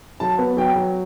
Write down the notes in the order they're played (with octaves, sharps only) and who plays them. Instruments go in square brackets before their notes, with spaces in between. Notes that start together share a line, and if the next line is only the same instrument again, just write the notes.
[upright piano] F#3 A5
B3
F#3 G5
F#3